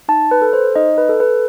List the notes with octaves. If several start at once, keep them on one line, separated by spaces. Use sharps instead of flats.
D#4 A5
B4
A4
C5
D#4 D#5
B4
A4
B4